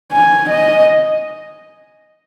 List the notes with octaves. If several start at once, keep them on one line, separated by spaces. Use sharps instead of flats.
G#5
D#5